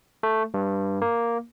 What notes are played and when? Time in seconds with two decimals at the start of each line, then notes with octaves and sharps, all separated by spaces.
0.23 A3
0.54 G2
1.02 A#3